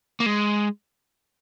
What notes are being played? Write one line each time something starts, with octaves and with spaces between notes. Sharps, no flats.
A#3
G#3